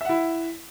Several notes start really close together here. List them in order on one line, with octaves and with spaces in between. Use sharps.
E5 F#5 E4